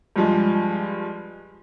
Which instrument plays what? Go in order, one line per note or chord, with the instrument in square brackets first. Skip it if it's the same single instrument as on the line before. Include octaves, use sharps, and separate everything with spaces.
[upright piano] G2 F3 G#3